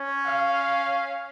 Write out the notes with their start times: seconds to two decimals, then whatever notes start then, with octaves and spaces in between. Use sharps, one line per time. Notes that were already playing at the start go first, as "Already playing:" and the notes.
Already playing: C#4
0.26 F5